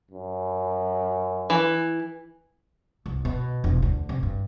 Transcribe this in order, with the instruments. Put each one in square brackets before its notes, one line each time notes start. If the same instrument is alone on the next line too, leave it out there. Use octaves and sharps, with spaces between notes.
[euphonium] F#2
[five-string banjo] E3
[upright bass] C2
B2
E1
D2
C3
G2